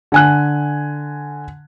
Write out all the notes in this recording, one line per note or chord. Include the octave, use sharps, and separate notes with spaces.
D3 G#5 F#6